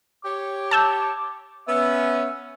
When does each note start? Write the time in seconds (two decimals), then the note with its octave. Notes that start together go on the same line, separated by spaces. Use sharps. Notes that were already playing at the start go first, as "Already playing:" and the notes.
0.25 G4 C#5 D6
0.71 A5 E6 G6
1.68 B3 C#4 E5